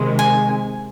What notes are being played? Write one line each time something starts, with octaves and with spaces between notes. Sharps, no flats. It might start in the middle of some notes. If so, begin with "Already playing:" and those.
Already playing: C3 D#3 G#3
G#5